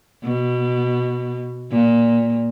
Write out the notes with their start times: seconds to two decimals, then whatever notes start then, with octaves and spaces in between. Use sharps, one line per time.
0.23 B2
1.71 A#2